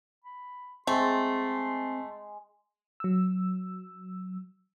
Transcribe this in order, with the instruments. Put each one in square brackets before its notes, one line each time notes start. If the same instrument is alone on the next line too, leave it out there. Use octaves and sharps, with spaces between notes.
[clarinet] B5
[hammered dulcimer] G#3 [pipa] A3 [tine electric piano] C4 [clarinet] C6
[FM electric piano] F#3 E6